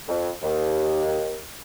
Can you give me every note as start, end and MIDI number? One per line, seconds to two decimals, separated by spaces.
0.08 0.30 41
0.42 1.43 39